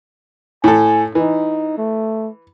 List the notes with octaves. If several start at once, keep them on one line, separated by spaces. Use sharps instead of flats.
A2 A4 G#5
E3 D#4
A3